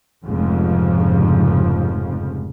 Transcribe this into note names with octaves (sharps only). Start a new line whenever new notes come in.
F1 F2 G#2 C#3 F3